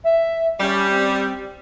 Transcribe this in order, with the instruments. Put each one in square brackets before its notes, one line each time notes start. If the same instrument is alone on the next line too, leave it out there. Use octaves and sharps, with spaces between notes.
[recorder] E5
[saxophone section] G3 [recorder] C#4
[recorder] C4